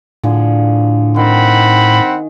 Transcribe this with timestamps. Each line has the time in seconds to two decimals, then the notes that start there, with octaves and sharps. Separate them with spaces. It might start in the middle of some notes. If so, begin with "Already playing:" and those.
0.23 A2 D3 F3 G#4
1.16 D#3 C4 F#5 B5